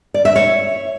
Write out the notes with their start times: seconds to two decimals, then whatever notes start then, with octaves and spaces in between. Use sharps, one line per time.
0.14 D5
0.25 E5
0.36 C#5